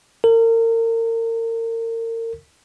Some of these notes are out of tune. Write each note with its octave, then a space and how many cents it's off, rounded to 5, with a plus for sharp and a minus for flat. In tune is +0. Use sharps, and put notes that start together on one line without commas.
A#4 -35